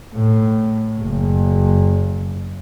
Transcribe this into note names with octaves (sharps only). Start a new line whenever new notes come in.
A2
F#1